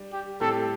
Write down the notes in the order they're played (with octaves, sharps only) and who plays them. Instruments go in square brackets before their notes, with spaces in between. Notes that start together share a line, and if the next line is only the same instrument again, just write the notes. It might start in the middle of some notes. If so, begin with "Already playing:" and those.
Already playing: [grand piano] G3 D4
[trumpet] G4
[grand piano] A2 G3 C4 G4 D5 [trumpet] A4